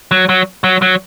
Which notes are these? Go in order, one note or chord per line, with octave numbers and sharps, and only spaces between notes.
F#3
F#3
F#3
F#3